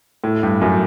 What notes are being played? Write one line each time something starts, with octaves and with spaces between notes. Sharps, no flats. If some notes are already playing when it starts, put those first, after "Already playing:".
A2
G2
F#2